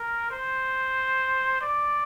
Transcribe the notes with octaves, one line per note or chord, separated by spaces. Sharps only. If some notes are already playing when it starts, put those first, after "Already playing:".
Already playing: A#4
C5
D5